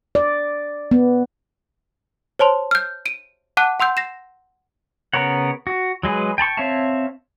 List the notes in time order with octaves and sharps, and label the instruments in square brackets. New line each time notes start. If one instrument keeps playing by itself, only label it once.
[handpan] D5
B3
[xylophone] C5 C#5 A5 C6
F6 G6
D7 D#7
F#5 A5 D6 F#6 D#7
F#5 C6 E6 G6
A#6 C7 E7
[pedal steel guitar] C#3 B3 A#4 C#5 F#5
F#4
F#3 G#3 G#4 B4
G5 A5 B5 C#6
C4 C#5 E5 F5 A5